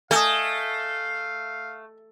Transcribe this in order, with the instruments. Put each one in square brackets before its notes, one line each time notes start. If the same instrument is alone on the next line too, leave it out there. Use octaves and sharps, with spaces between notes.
[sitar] A3 [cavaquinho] D#5 G#5 [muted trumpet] F5